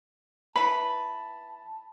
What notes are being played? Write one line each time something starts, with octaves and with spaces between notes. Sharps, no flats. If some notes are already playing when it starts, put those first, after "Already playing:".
E3 B4 A5 B5